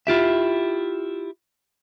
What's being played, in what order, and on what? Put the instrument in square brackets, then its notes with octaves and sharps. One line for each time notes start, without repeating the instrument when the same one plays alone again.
[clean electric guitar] E4 F4 G4 E5